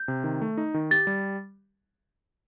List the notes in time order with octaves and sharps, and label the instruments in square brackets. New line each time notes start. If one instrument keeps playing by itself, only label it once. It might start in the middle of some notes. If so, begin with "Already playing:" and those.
Already playing: [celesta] G6
[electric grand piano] C3
D#3
A3
D#4
D#3
[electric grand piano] G4 [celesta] A6
[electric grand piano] G3